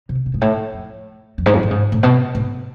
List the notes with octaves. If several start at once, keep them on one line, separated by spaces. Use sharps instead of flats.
C3
B2
G#2
A2
F2
F2
G#2
F2
A2
G#2
A2
B2
A2